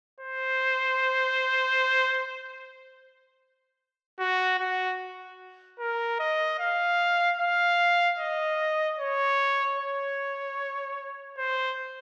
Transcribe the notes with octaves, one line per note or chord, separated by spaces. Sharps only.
C5
F#4
F#4
A#4
D#5
F5
F5
D#5
C#5
C#5
C5